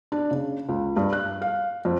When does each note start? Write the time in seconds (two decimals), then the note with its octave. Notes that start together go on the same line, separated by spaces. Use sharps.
0.12 D4
0.31 C#3
0.69 C#2
0.96 G2
1.13 F#6
1.42 F5
1.85 F2